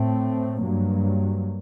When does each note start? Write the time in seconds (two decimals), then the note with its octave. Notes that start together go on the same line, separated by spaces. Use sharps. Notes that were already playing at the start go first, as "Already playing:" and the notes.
Already playing: A2 A3 C4
0.60 G2 F#3 A#3